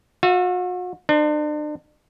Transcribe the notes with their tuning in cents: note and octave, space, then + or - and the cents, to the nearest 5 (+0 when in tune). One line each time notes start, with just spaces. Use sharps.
F#4 -40 E5 +25
D4 +40 C5 -15